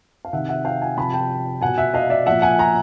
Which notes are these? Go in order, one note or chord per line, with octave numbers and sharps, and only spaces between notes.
F5
C3 D#3 E5 F#5
E5 F#5
F5 G5
F#5 G#5
C3 F3 A5 B5
G5 A5
B2 F#5 G#5
E5 F#5
D#5 F5
D5 E5
A#2 F3 E5 F#5
F#5 G#5
G#5 A#5